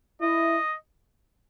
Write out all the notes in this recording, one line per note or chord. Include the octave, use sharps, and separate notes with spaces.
E4 D#5